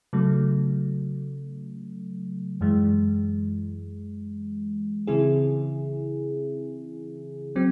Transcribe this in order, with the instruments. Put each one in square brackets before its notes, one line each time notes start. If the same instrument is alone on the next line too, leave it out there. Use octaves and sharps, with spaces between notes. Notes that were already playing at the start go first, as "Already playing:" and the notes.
[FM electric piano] C#3 F#3 A3
F#2 E3 G#3
C#3 E3 C4 E4 G#4
F#3 C4